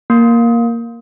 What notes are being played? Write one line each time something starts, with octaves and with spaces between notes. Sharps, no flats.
A#3